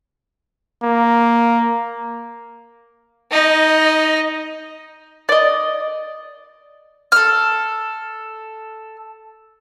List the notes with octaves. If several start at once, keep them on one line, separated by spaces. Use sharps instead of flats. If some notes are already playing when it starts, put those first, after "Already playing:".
A#3
D#4 D#5
D5 D#5
A4 F6